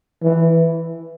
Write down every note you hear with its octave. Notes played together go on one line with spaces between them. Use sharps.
E3